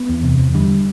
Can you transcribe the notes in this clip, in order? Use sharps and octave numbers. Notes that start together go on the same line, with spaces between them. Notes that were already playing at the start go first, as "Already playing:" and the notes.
Already playing: B3
E2
C3
E2
D3 G3